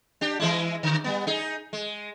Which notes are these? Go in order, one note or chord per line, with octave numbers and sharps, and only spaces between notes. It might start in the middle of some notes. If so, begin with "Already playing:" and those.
D4 G4
E3 G#3 E4
D3
G3 B3
D#4 G#4
G#3